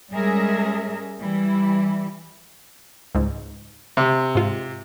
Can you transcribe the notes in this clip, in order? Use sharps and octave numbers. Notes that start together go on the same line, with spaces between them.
G3 G#3 C#4 G#4 A#4 E5
E3 G3 E4
C#2 G#2
C3
G#2 F4